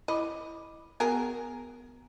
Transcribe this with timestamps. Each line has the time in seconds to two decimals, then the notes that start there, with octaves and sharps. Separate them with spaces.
0.08 E4 D#5 B5 D6
1.00 B3 F#4 G#4 A#4 A5